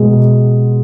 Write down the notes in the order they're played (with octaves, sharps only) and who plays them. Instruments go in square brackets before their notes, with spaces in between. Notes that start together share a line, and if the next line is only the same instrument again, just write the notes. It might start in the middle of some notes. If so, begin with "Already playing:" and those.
Already playing: [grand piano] B2 G#3